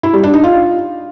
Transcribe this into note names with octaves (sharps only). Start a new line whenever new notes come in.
E4
G3
D4
D#4
F4